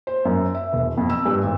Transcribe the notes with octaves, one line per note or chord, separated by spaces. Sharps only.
C5
F#2
E5
E1
F2
E6
G2
G#1